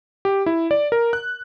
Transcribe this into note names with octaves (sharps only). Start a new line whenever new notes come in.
G4
E4
D5
A#4
F#6